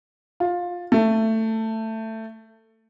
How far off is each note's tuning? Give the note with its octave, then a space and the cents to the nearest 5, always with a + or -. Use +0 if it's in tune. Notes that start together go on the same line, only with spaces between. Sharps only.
F4 +15
A3 +15